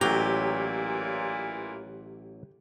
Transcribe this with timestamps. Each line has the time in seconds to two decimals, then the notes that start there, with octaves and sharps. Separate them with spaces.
0.01 A1 A#2 E3 F#3 G4 A#5